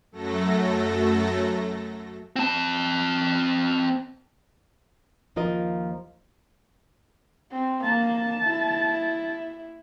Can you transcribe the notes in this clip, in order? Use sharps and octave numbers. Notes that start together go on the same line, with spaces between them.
F#2 F#3 A3 A4 A#6
C4 A5
D#2 F3 F4 A#4 D#5
C4
A#3 A5
E4